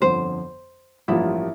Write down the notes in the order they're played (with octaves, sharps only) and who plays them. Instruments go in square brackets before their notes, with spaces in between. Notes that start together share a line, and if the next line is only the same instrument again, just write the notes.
[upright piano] G1 F2 D3 F3 [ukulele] C5
[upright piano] A1 G2 F3 A#3 F4 [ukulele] E4